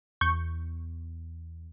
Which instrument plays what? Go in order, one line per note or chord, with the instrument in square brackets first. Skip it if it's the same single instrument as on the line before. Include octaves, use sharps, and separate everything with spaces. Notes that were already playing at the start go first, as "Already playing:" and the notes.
[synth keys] E2 [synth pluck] C#6 G6